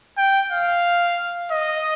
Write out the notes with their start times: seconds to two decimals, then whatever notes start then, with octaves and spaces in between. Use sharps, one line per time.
0.18 G5
0.52 F5
1.51 D#5